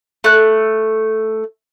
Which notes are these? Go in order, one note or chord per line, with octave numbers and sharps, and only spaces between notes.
A3 F#6